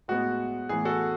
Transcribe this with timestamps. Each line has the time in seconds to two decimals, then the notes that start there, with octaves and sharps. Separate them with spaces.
0.08 A2 G#3 B3 F#4
0.69 A2 E3 B3 G#4
0.85 F#4 A4